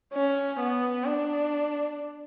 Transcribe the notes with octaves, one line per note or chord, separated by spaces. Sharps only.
C#4
B3
D4